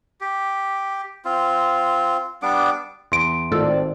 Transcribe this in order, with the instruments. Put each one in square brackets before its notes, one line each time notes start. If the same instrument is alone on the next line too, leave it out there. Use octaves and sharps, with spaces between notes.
[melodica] G4
C4 F4
G3 B3 D4 D6
[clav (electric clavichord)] E2 [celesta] C6 D7
[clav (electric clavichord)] G#1 [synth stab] A2 F4 A4 [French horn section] C4 D5